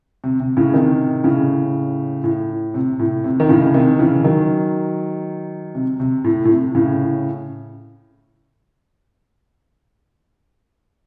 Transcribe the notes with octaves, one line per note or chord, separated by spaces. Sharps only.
C3
C3
A2 C#3
C3 D#3
A2 C#3
A2
C3
A2
C3
D#3
A2 C#3
C3 D#3
C#3 E3
D#3 F#3
C3
C3
A2
A2
C3
A2 C#3